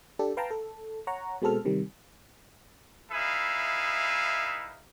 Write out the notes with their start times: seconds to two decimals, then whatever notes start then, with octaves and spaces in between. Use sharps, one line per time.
0.19 D4 G4 A4
0.37 B4 F5 G5 A5 A#5
0.51 A4
1.07 C#5 F#5 A#5
1.42 B2 G#3 C4 A4 F6
1.65 C3 D#3 G3
3.12 D#4 E4 G#4 B4 E5 F5